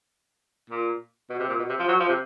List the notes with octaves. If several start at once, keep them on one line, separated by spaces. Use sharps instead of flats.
A#2
B2
C3
A#2
B2
C3
F3
F#3
F3
C3